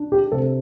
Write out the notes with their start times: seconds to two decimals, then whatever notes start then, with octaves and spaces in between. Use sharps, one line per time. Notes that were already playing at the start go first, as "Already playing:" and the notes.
Already playing: D4
0.12 G4
0.32 C3 A4